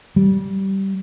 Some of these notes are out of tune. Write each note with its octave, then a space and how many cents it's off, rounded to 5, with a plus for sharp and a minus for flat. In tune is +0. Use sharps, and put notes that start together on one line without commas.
G3 -15